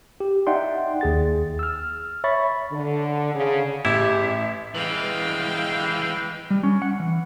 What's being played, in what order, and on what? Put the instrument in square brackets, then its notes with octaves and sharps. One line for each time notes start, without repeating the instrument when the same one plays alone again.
[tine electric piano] G4
D#4 D5 E5 F#5 G5 C6
D#2 G#4 A6
E6 F6
C#5 E5 B5 C#6 A6
[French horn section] D3
C#3
[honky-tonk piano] A1 [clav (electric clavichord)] E4 [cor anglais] G4 [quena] E5
[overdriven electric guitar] E3 G#3 [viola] F5 G5
[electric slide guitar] G3
C#4
F#5
E3